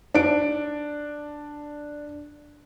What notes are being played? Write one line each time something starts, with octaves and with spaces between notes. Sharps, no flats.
D4 D7